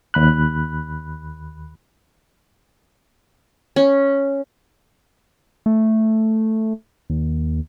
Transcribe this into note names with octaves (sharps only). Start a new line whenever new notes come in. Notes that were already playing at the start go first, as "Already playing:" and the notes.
D#2 B5 F#6
C#4
A3
D#2